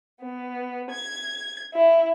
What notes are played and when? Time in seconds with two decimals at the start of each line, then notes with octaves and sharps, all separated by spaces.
0.20 B3
0.89 G#6
1.71 E4